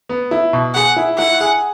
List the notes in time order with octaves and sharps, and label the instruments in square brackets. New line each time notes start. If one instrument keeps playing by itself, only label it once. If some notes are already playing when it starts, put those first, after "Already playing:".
[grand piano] B3
E4
B2
[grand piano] G#4 [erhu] F#5
[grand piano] E4
[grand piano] E4 [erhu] F#5
[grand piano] G#4